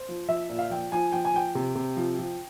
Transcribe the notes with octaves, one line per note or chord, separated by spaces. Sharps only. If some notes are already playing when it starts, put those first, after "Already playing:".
Already playing: C5
F3
F3 E5
A#2
F5
F3 G5
F3 G#5
F3 G5
G#5
F3 G5
C3
C3
F3
F3